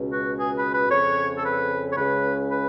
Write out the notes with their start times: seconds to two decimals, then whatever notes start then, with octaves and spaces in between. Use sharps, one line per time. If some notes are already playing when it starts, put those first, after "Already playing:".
Already playing: C#2 B2
0.11 F#4
0.38 G#4
0.55 B4
0.72 B4
0.89 F2 C#3 C#5
1.35 A4
1.43 B4
1.90 C#5
1.96 C#2 C#3 B4
2.50 B4